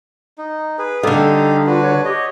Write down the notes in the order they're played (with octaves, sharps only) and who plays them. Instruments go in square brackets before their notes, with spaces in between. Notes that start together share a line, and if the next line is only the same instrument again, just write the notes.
[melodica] D#4
G#4 B4
[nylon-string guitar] D3 G3 [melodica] D#4 G4 F5 [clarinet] A4
[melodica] D4 F#4 B4 [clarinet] F4
[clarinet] C#5
[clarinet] G4 [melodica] C#5 D#5